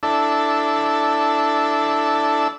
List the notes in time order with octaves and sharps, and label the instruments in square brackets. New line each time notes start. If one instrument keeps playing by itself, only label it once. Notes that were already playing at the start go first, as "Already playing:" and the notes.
[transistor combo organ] D4 E4 A4